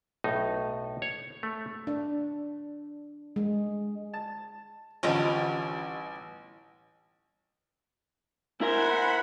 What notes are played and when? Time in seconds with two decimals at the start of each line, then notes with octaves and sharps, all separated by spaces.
0.24 B1 A2 D#4
1.02 C#5
1.43 A3
1.87 D4
3.36 G#3
4.14 A5
5.03 A1 D2 F3 G3 B3 C#4 F4 D#5
8.61 E4 A#4 C5 E5 F#5 G#5 B5 C6